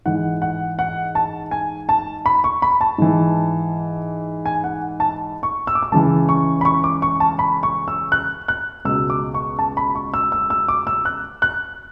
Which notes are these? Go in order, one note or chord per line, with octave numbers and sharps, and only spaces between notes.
G#2 E3 F#5
F#5
F#5
A5
G#5
A5
B5
C#6
B5
A5
G#2 E3
G#5
F#5
A5
C#6
E6
D6
E6
C#2 C#3 E3 A5
C#6
B5
C#6
D6
C#6
A5
B5
C#6
E6
F#6
F#6
C#2 B2 E6
D6
C#6
A5
B5
C#6
E6
E6
E6
D6
E6
F#6
F#6